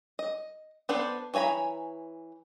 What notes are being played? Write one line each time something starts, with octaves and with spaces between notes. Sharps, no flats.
D#5
B3 D4 A4 B4 C5
E3 C#5 G#5 A#5 B5